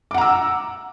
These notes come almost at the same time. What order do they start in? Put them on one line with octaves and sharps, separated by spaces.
D6 F#5 A#5 E6